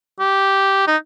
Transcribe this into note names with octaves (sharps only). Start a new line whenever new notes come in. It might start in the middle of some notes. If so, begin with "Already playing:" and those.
G4
D#4